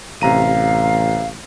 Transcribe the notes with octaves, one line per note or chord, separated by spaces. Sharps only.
A1 C3 F5 A#5 D#7